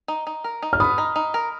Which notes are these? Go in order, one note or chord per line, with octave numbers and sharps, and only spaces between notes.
D#4
D#4
A#4
D#4
F6
B3 B5 D#6
D#4
D#4
A#4